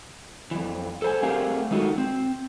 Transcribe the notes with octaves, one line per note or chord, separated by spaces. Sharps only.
F2 E3
A4 C5 G#5
A3 C4 G4 G#4 A#4 F5
D#3 G#3 D#4 F4 F#4 A4
C4